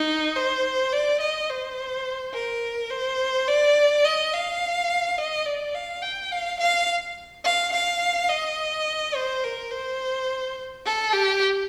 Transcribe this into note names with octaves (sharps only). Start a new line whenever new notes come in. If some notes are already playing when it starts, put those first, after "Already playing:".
Already playing: D#4
C5
D5
D#5
C5
A#4
C5
D5
D#5
F5
D#5
D5
F5
G5
F5
F5
F5
F5
D#5
C5
A#4
C5
A4
G4